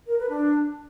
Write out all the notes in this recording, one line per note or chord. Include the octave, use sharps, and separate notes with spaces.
A#4
B4
D4